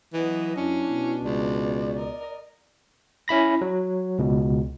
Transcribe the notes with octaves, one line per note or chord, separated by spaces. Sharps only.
E3 F#3 B3 D#5
F#2 C#4 D4 E4
B2
C#2 D5
A#4 D#5
C#4 E4 B5 A#6
F#3
C#2 B2